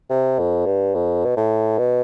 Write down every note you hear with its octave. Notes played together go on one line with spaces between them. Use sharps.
C3
F2
G2
F2
B2
A2
B2